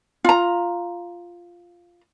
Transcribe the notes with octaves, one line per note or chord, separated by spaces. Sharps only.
F4 A#5